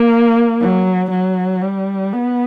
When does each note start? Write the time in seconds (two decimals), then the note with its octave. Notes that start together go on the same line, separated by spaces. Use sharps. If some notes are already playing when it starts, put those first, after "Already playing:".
Already playing: A#3
0.61 F#3
1.11 F#3
1.62 G3
2.12 B3